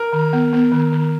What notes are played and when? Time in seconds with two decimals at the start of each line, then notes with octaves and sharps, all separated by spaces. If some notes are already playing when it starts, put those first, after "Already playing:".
Already playing: A#4
0.13 D#3
0.33 B3
0.53 B3
0.72 D#3
0.92 D#3